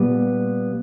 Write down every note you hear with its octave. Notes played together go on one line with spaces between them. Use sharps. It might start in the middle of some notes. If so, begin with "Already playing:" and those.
Already playing: A#2 G3 B3